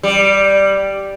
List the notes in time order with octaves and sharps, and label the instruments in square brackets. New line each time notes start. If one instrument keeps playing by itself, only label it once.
[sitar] G3